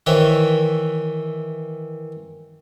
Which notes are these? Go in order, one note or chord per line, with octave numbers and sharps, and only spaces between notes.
D#3 E3 C5 C#5 E5